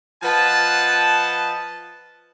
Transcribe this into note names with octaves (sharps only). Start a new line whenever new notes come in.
F3 B4 D#5 F#5 A5